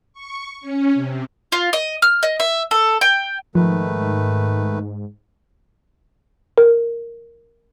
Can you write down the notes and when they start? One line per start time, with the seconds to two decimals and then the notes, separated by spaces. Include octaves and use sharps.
0.13 C#6
0.61 C#4
0.94 C3
1.52 F4
1.73 D#5
2.02 F6
2.23 D#5
2.40 E5
2.71 A4
3.01 G5
3.55 G#2 D#3 F3 A3 B4
6.58 A#4